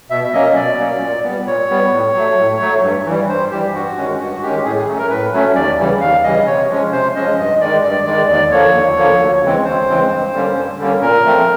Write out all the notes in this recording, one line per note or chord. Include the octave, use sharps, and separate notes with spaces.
B2 E5
E5
F#3 A#3 C#4 D#5
B2 D5
F#3 A#3 C#4
A#2
G3 B3
A#2 C#5
G3 B3
A2
F#3 A3
A2
F#3 A3
G2
E3
G3
G2 C5
E3 G3 G4
G2 F#4
D#3 G#3 C#4
G2 F#4
D#3 G#3 C#4 G4
A2 G#4
G#4
F#3 A3 C#4
A#4
A2 B4
F#3 A3 C#4
D#2 D5
C#3 E3 G3
D#2 F5
C#3 E3 G3 D#5
C3 C#5
F3 G#3 C#4
C3 C5
F3 G#3 C#4 D#5
G2 D#5
D#3 G#3 D5
G2 D5
D#3 G#3 D5
D#2 D5
D3 F3 A#3 C#5
D#2
D3 F3 A#3
D2
C#3 E3 G#3 C4
D2 C5
C#3 E3 G#3 C4
G2
D3 G3 A#3 C#4
G2
D3 G3 A#3 C#4
A#2 A#4
F3 A3 C4